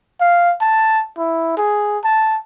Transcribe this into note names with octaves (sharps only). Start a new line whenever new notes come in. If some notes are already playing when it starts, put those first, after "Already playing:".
F5
A5
E4
G#4
A5